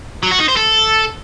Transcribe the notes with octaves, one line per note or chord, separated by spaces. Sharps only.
F#3
F#4
D#4
C5
A4